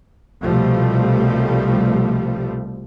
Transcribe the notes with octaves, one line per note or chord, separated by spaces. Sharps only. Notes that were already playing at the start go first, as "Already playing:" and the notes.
C2 B2 F3 G3 A3